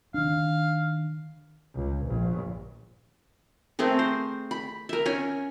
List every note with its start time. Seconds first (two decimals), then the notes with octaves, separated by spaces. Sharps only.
0.14 D#3 D4 F5
1.75 C#2
2.05 A#1
3.79 A3 C4 G#4 A#4
3.99 C5
4.51 B5
4.89 A#4 E5
5.06 C#4 C#5 G#5